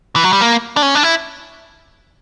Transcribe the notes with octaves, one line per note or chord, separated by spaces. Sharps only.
E3
F#3
G3
A#3
D4
C#4
D4
E4